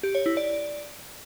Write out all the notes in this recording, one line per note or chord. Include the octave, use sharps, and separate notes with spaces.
G4
C#5
E4
D5